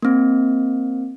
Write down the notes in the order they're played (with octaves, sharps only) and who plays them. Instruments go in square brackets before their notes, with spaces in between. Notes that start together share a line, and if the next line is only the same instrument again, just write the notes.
[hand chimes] A#3 C4